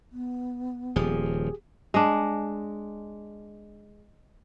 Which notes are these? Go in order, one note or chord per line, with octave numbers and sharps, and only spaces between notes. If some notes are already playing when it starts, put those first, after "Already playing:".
B3
D#1 F3 G4 G#4
G#3 D4